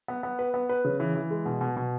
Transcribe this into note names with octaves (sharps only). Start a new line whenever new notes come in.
B3
B3
B4
B3
B4
C#3
E3
E3
G#3
B2
B2
B2